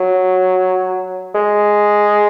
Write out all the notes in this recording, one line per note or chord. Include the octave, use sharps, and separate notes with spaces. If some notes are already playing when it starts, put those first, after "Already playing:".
Already playing: F#3
G#3